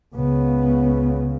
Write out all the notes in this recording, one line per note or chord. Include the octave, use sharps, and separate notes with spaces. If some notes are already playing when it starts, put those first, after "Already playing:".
C#2 C#3 B3